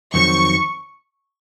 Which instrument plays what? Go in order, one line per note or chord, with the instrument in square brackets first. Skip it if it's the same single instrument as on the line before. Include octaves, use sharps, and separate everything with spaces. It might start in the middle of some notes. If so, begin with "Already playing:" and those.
[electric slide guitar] F2 D#3 F#3 C4 [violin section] C#6